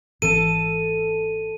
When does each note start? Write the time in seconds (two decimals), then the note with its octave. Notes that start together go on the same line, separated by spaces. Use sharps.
0.22 G#1 E3 C4 A4 A5 D#7